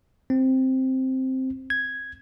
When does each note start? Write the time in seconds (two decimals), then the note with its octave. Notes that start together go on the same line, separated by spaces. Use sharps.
0.30 C4
1.70 G#6